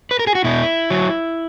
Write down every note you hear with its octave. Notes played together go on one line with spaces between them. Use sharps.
B4
A#4
G#4
F#4
B2 E4
F#3